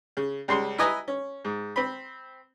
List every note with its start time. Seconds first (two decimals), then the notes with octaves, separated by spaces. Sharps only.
0.17 C#3
0.48 C#2 C#3 G3 C6
0.78 E4 B4 D#5 G#5 A#5 B5
1.08 C#4
1.45 G#2
1.76 C4 B5